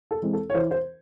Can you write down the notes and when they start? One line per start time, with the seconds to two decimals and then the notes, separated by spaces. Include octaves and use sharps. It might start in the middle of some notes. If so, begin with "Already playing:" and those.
0.11 A4
0.22 E3 G#3 C4
0.33 A4
0.50 C#5
0.54 E3 C5
0.71 C5